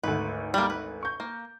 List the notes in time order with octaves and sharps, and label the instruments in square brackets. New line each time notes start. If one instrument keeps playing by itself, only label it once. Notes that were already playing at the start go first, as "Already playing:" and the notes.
[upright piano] G#1 D2 [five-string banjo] B4
[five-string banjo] G3 A#3
B4
[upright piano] C#6 G6
[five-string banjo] A#3